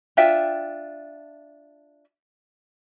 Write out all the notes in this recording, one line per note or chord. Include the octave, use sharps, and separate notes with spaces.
D4 F4 E5 G5